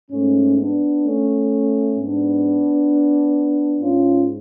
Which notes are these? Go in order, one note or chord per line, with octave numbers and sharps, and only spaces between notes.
G#2 A3 C#4
B3 D4
A3 C#4
G#2 B3 D4
G#2 C#4 F4